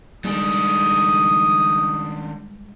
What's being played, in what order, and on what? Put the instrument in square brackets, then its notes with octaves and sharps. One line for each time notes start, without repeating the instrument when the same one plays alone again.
[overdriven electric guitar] D#3 D4 [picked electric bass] G3 G#3 [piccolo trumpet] D#6